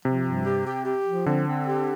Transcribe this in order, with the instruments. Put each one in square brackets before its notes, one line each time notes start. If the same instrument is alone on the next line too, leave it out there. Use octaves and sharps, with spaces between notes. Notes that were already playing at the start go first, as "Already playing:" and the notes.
[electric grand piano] C3 [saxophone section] F3
[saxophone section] G2
G4
G4
G4
F3
[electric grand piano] D3 [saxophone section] C4
[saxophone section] C4
G4